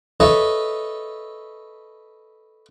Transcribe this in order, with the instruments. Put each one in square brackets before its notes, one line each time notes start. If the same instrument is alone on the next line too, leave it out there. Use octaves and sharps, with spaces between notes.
[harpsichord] A4 B4 C#5 D#5 E5